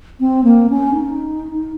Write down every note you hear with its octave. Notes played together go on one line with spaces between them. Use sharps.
C4
A#3
C#4
D#4